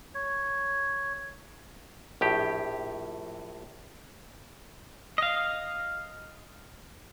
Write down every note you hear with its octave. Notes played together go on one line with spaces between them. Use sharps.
C#5
A#1 A2 G4
D#5 F5